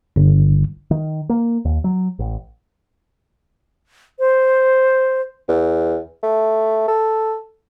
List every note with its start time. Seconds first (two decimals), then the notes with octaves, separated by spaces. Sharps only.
0.16 G1
0.91 D#3
1.29 A#3
1.65 D#2
1.84 F#3
2.19 A1
4.19 C5
5.49 E2
6.23 A3
6.88 A4